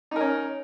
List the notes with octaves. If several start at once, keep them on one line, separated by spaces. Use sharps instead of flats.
C#4 D#4 A#4